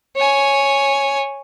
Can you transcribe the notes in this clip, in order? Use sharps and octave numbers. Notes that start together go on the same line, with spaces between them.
C#5 G#5